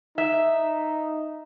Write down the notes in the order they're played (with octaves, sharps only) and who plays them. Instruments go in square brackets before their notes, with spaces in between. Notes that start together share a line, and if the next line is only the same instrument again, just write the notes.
[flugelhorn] D#4 [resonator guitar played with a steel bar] E5